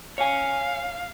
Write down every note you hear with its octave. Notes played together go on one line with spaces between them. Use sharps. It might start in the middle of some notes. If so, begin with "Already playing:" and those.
C#5 F5 G#5